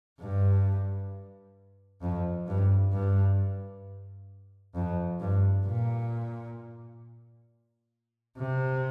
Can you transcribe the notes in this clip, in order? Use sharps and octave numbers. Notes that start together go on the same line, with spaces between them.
G2
F2
G2
G2
F2
G2
A#2
C3